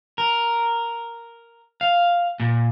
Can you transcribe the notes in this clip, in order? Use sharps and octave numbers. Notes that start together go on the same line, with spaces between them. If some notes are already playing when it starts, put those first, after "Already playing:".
A#4
F5
A#2